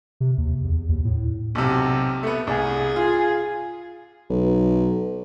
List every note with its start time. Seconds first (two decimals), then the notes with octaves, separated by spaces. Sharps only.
0.20 C3
0.38 D#2
0.64 E2
0.89 D#2
1.05 A2
1.55 B1 C3
2.23 A3 B3
2.47 C2 G#4
2.96 F4
4.30 B1